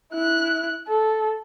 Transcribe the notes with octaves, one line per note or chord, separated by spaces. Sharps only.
E4 F#6
A4